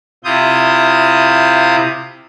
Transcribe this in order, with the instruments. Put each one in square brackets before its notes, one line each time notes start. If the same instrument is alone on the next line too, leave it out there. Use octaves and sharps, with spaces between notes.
[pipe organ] C3 E4 F4 D#6 G6